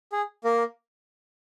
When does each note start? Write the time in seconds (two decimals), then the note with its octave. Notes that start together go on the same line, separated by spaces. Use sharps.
0.12 G#4
0.44 A#3 A#4